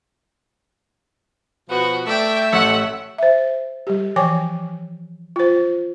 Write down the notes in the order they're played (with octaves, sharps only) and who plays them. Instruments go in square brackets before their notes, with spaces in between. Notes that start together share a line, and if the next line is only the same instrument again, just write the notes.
[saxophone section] B2 F3 B3 [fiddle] F#4
[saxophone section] A3 [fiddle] D5 G5 [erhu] E5
[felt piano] A1 E6 C#7 [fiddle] F#5
[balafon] C5 E5
G3 G4
E3 F3 C#5 G5 G#5 D6
F4 C5